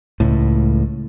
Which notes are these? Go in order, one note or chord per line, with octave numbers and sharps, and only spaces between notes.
C#2 A2